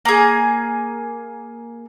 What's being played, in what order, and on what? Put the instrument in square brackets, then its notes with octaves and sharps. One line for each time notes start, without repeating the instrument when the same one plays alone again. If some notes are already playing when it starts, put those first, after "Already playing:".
[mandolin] A#3 G#4